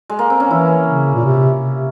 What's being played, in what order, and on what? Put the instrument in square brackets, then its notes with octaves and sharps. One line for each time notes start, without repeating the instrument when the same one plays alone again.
[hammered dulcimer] G#3
A#3
C4
C#4
[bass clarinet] E3 [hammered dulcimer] E4
[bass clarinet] C#3
A#2
C3
C3